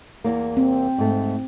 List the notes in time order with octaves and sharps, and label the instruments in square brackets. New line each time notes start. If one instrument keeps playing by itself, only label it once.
[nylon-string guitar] E2 A#3
[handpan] C4
[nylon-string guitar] G#2 A3